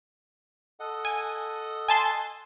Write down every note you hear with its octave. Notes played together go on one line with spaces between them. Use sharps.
A4 D#5 F#5
G#5
G#5 A5 C6